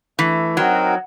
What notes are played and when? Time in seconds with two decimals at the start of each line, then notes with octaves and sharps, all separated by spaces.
0.19 E3 A3
0.56 F#3 C4 D#4 F#4 A#4